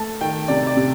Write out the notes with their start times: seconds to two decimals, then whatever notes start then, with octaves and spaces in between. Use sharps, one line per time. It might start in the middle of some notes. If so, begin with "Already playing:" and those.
Already playing: A3 A5
0.21 D#3 G5
0.48 C3 D5
0.67 D5
0.77 C3